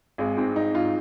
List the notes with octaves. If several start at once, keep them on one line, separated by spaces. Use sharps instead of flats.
G#1 G#3
G#2 C4
G#1 D#4
G#2 F4